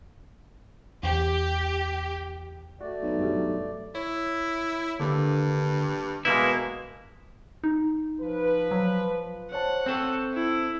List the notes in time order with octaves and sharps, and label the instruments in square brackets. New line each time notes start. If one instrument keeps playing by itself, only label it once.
[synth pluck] E2 [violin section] G4
[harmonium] A3 D5 [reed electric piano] F#4
[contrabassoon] B1
[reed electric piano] G2 F#3 G3
[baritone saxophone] E4 [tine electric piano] C#5
[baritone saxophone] G2 [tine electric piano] D3 A#3
[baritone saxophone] B2 [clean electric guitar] G#3 A#3 E4 [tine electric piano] B4
[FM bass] D#4
[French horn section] F3 B4
[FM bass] F#3
[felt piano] C5 C#5 A5 [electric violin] F#5
[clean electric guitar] C4 A4 [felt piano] G5 C#6
[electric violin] E4